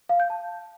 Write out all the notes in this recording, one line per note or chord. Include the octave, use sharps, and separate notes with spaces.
F5
G6
A5